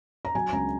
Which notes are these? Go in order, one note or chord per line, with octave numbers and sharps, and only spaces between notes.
A#5
F#3 G#5
C#2 A#5